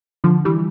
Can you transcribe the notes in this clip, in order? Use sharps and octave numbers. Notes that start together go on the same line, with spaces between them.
D3 F3
E3 G3